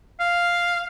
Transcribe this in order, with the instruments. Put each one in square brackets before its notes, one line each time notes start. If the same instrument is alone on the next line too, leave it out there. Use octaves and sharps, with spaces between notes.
[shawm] F5